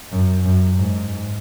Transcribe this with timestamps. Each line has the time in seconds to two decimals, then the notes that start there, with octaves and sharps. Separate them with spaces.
0.12 F#2
0.44 F#2
0.76 G#2